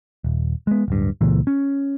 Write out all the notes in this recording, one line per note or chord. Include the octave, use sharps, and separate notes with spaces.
D#1
G#3 B3
D1 G2
C#2 A#2 E3
C#4